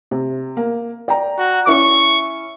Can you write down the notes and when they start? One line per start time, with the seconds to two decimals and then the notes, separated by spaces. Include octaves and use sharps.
0.11 C3
0.57 A#3
1.08 D5 G5 A#5
1.38 F#4
1.67 C#4 E4 E5 C#6